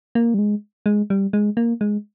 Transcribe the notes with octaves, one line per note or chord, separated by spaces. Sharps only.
A#3
G3
G#3
G#3
G3
G#3
A#3
G#3